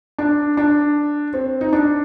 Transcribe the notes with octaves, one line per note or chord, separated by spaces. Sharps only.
D4
D4
C4
D#4
D4